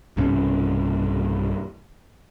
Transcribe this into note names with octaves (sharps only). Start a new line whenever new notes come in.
B1 G2 C3 C#4